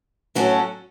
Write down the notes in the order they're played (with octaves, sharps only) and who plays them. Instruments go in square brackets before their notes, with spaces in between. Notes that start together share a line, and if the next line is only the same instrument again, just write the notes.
[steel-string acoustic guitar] A2 F#3 C#4 F#4 A4